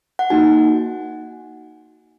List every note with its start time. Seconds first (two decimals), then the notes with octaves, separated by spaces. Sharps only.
0.19 F#5
0.30 A#3 D#4 F#4 G#5